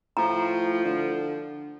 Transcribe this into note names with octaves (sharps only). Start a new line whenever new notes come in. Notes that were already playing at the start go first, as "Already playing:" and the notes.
A2 F3 A#5
D3